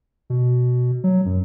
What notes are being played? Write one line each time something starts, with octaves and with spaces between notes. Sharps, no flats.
B2
F#3
F#2